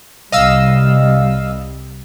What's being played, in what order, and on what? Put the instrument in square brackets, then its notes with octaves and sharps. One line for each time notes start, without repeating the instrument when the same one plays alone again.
[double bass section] C2 G3 [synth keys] D#5 F5 E6